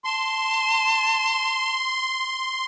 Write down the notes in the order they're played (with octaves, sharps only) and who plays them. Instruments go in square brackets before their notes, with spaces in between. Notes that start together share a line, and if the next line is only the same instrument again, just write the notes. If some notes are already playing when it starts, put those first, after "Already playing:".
[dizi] A5 [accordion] C6